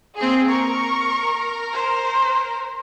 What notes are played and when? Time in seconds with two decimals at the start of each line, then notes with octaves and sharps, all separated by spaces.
0.18 A#3 C4 G#4
0.49 A#4 C#6
1.73 C5